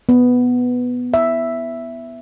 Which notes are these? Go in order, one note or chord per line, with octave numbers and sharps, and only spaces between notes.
B3
E5